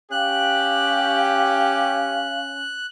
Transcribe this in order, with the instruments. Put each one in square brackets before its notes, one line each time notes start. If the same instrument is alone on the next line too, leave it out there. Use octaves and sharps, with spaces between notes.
[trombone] C#4 [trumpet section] G4 [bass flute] F5 [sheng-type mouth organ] F#6